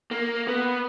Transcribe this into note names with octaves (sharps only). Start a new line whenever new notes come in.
A#3
B3